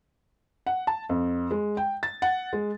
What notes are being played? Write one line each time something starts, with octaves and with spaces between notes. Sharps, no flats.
F#5
A5
F2
G#3
G5
A6
F#5
G#3